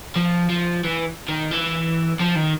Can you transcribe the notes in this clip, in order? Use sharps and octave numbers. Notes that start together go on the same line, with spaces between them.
F3
F3
E3
D#3
E3
F3
D#3